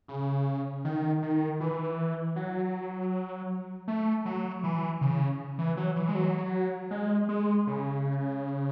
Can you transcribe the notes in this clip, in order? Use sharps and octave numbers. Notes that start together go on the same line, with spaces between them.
C#3
D#3
D#3
E3
F#3
A3
F#3
E3
C#3
E3
F#3
E3
G#3
F#3
G#3
G#3
C#3